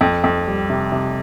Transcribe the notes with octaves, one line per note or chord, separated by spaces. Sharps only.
F2
F2
G3
C3
C3